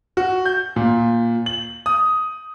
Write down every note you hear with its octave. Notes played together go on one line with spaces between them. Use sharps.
F#4
G6
A#2
F#7
D#6